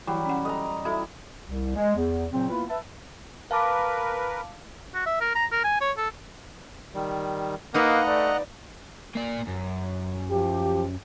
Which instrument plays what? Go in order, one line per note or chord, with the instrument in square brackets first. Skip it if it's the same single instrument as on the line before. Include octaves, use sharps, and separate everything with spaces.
[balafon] E3 E4 F#5 [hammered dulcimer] F#3 G3
[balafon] C#4 F#5
[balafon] A4 [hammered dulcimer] D#5 A#5
[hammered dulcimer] E4 [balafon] F#4 A4 E5
[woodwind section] C2
G#3
E2
A#2 C#3 F#3 C4
A#3 B3 E4 F4 B4
B4 E5 A5
[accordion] A#4 B4 [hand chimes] F5 A5 D6
[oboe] F#4
E5
A#4
A#5
A#4
G#5
C#5
A4
[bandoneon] D#3 G3
[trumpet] A#3 [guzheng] D#4 B4 [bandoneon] D#5 F#5 A#5 [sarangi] F5
[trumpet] A3 [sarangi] D5
[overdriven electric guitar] A#3 D5
F#2
[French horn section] F3 G4